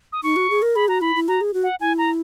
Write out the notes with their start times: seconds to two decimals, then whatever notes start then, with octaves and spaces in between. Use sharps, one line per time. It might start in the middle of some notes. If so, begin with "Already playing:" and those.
0.13 D#6
0.23 D#4 C#6
0.36 F#4
0.50 G#4
0.62 A#4
0.75 G#4 B5
0.88 F#4 A#5
1.01 E4 B5
1.16 E4
1.28 F#4 A#5
1.41 G#4
1.54 F#4
1.63 F#5
1.81 E4 G#5
1.98 A#5